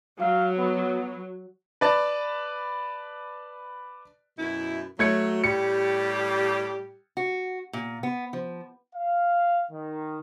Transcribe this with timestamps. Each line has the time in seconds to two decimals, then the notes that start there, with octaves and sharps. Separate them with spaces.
0.20 F#3 F5
0.58 B3
1.81 B4 D5 A5
4.38 F#2 B2 E4
4.99 F#3 A3 G#6 C#7
5.44 A2 G3 G4 C#7
7.17 F#4
7.73 A#2
8.03 B3
8.33 F3
8.95 F5
9.72 D#3